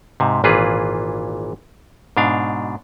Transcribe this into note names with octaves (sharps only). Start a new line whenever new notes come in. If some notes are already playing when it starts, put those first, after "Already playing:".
G#2 C3
G#1 A#2 E3 F4 G#4 B4
G#2 B2 D4 F5